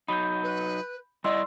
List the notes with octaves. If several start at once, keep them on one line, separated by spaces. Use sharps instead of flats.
F#3 D#4 B5 G6
B4
G3 E4 D5 D#5 C6 E6